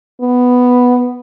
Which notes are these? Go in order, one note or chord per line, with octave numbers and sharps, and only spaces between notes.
B3